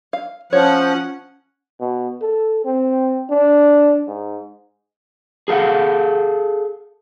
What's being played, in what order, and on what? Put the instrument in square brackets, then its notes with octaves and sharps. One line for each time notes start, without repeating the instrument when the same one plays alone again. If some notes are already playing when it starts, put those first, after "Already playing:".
[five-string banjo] F5
[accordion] F3 [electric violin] C#4 F#5 [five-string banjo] C#5
[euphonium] B2
A4
C4
D4
G#2
[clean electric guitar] G#4 A4 F5 F#5